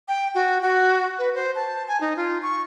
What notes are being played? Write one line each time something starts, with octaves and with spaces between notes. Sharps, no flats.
G5
F#4
F#4
B4
C5
A5
G#5
D#4
F4
C#6